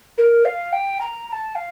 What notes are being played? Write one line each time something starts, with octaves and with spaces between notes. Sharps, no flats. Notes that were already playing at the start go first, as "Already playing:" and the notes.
A#4
F5
G5
A#5
A#5
A5
F5